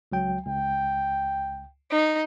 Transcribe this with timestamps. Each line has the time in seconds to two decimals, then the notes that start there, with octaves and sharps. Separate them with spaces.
0.12 C#2 F#3 G5
0.46 C#2 G5
1.91 D#4